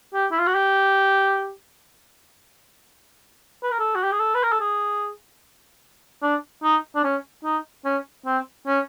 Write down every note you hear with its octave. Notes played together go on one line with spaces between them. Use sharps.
G4
E4
F4
F#4
G4
B4
A#4
A4
F#4
G4
G#4
A4
B4
A#4
A4
G#4
D4
D#4
D4
C#4
D#4
C#4
C4
C#4